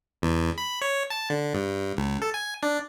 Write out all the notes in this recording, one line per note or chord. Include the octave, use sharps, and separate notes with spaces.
E2
B5
C#5
A5
D3
G2
C#2
A4
G#5
D4